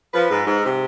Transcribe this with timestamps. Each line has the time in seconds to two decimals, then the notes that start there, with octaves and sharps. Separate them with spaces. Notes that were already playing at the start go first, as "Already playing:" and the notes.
0.13 F3 B4
0.30 G#2
0.46 G#2
0.63 C3